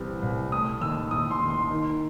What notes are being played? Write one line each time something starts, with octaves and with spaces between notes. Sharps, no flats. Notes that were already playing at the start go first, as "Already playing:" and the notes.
Already playing: C2 C3 E3
C2
A3 D#6
D#2 E6
D#2 D#6
C6
D#2
C6
D#3